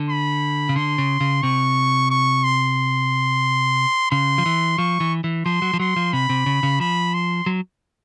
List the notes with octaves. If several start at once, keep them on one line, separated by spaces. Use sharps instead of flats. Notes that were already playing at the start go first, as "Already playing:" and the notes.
Already playing: D3
B5
C#3
D3 C6
C#3
C#3
C3 C#6
C#6
C6
C#3 C6
F3
E3
F3 C#6
E3
E3
F3 C6
F#3
F3
F#3 C6
F3
C3 B5
C3
C#3
C#3
F3 B5
C6
F#3